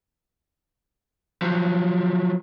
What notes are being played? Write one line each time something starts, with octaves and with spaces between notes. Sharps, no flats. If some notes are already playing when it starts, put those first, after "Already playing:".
F3 F#3